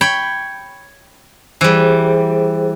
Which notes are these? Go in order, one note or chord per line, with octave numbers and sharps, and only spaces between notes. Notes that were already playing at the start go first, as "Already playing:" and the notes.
C#5 G5 B5
E3 G3 G#4 C5